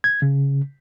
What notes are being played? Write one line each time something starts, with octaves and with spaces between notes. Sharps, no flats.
G#6
C#3